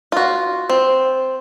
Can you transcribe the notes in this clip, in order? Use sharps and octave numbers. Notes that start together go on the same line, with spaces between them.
F4 F#4
C4